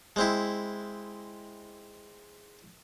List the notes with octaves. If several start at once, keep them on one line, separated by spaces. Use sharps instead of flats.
G#3 C4 E4